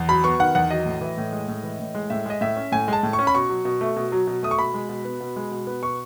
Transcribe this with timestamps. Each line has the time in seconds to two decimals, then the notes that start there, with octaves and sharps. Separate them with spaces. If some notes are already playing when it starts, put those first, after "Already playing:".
Already playing: E2
0.08 F#3 B5
0.24 B3 C#6
0.39 D#3 F#5
0.55 E2 F#5
0.70 F#3 D#5
0.86 A2
1.01 E3
1.17 A2
1.32 G#3
1.48 A2
1.63 E3
1.80 A2
1.95 G#3
2.10 A2 E5
2.26 G#3 D#5
2.41 A2 E5
2.56 C#4
2.72 A2 G#5
2.88 G#3 A5
3.03 A2
3.13 C#6
3.19 C#4
3.27 B5
3.34 B2 C#6
3.50 F#3
3.65 B2
3.81 A3
3.96 B2
4.12 F#3
4.27 B2
4.43 A3 D#6
4.51 C#6
4.58 B2 B5
4.74 G#3
4.89 B2
5.05 B3
5.20 B2
5.36 G#3
5.51 B2
5.67 B3
5.82 B2 C#6